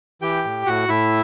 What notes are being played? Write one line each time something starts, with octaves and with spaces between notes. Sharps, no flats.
E3 G4 G5
A2
A2 F#4 F#5
A2 E4 E5